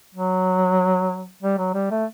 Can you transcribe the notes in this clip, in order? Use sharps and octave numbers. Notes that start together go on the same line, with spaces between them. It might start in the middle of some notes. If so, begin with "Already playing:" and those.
F#3
G3
F#3
G3
A3